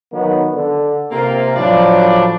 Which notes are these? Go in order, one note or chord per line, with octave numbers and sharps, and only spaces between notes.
D#3 F#3 B3
D3
C3 A#3 C4 F4
A2 F3 F#3 D4